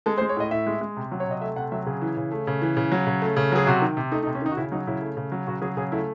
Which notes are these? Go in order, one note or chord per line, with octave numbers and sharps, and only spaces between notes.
G#3 A4
C5
G#3
C#5
A2 D#5
A2 E5
G#3
G#3
C3
F#3
C#5
C3 D#5
A3 E5
C3 F#5
F#3 E5
C#3 G#4
E3
C#3
A3
C#3
E3
C#3
F#3
C#3
A3
C#3
F#3 G#4
C3 F#4
D#3
C3
A3 D#4
D#4
C3
C#4
D#3 D#4
F#4
C#3 E4
F#3 D#4
C#3 E4
A3
C#3
F#3
C#3 F#4
F#3 G#4
C#3 G#4
A3 E4